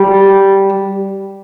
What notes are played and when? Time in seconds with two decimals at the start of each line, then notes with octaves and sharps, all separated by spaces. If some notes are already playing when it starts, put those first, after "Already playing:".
Already playing: G3